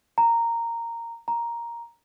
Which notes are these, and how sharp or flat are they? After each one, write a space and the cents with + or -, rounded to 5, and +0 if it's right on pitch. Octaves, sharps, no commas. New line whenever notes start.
A#5 -10
A#5 +5